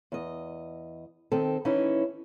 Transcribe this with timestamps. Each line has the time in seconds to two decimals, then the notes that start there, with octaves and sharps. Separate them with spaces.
0.12 E2 D#5
1.32 D#3 C4 A4
1.65 E3 C#4 D#4 E4